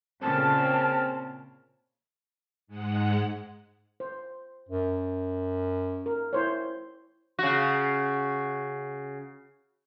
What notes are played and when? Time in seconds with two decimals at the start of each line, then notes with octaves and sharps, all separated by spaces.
0.22 A#2 C#3 C4 A5 F6
2.67 G#2 G#3 F#5
4.00 C5
4.69 F#2
6.06 A#4
6.33 E4 C5 C#5
7.39 C#3 F#4